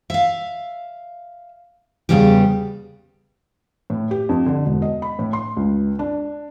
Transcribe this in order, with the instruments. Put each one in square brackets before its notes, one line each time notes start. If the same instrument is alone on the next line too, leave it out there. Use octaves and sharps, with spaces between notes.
[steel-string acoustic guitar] E5 F5
E2 G#2 C#3 G3 B3 G4
[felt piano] A2
G4
F2
D3
E1
D#5
B5
A2
C6
C#2
D4